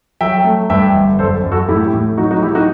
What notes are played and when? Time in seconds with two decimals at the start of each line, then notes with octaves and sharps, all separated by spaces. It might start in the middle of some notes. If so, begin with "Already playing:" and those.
0.21 F#3 E5 G5
0.44 A3
0.70 G2 E5 G5
0.94 G1
1.19 F#2 A4 C5
1.43 F#2
1.52 F#4 A4
1.69 A2 E4 G4
1.93 A2
2.17 F#3 D#4 F#4
2.31 D#4 F#4
2.42 F#3 E4 G4
2.55 D#4 F#4